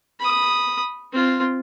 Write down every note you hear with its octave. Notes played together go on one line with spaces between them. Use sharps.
B5 D#6
C4 F4